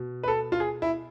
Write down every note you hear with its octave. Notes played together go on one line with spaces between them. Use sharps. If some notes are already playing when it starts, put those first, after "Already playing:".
Already playing: B2
B4
A4
F4
G#4
E4